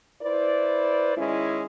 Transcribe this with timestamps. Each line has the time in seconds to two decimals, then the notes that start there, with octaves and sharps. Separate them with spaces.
0.22 E4 B4 C5 D5
1.17 D#3 G#3 C#4 E4